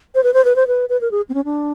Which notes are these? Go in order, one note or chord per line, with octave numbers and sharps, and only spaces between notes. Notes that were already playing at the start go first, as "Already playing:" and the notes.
C5
B4
C5
B4
C5
B4
B4
A#4
G#4
C4
C#4
D4